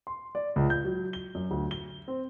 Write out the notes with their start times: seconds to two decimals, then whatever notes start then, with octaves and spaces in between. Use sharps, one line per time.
0.07 C6
0.35 D5
0.56 C#2
0.70 G6
0.84 F#3
1.13 G7
1.35 F#2
1.51 D2
1.71 G7
2.08 C4